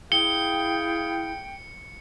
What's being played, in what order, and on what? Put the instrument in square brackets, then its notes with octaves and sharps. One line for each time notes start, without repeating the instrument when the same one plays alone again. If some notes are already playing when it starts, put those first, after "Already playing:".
[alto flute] E4 [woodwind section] G#4 F5 G5 [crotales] C#7 [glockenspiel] G7